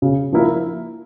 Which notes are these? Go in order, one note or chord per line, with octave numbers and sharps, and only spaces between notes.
C#3
F3 A#3 E4 A#4